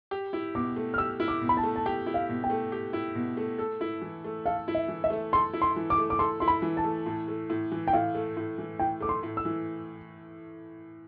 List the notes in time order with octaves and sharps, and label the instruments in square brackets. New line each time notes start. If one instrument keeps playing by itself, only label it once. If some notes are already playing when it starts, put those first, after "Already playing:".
[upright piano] G4
E4
[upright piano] B2 [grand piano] D6
[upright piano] A3
[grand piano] F6
[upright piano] G4 [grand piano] E6
[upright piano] E4
[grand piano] D6
[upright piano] B2
[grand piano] B5
A5
[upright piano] A3
[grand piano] A5
[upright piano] G4 [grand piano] G5
[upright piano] E4
[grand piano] F5
[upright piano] B2
[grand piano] G5
[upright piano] A3
G4
E4
B2
A3
A4
E4
E3
A3
[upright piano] A4 [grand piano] F5
[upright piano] E4
[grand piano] E5
[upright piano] E3
[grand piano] E5
[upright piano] A3
[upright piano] A4 [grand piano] C6
[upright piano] E4
[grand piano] C6
[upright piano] E3
[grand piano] D6
[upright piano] A3
[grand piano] D6
[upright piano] A4 [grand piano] C6
[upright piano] E4 [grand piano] C6
[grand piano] B5
[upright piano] E3
[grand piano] A5
[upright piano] A3
A2
A3
A2
E3
[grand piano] G5
[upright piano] A2 [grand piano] F5
[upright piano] A3
A2
E3
[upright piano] A2 [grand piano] G5
[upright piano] A3 [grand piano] D6
[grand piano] C6
[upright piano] A2
[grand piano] E6
[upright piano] E3